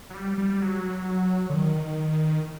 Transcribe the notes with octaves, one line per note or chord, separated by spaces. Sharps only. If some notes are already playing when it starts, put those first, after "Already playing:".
F#3
G3
G3
F#3
D3
D#3